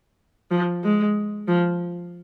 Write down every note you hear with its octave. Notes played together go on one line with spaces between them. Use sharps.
F3
G#3
F3